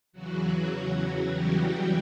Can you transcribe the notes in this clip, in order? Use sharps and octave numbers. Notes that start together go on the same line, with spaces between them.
E2 C#3 E3 F#3 F#4
G3 G4